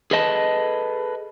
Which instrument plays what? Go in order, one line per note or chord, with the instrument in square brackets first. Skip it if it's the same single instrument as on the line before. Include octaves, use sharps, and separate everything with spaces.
[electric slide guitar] G#4 A4 B4 D#5 A5